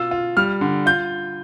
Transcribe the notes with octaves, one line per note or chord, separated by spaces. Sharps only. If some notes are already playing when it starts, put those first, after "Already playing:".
Already playing: B2 F4 E6
F4
G3 F6
D3
F4 G6